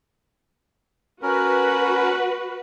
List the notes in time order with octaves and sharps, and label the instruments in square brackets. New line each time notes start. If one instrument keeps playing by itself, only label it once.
[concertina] C#4 A#4 [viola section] F#4 B4